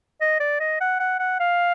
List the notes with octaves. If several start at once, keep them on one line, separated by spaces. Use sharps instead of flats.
D#5
D5
D#5
F#5
F#5
F#5
F5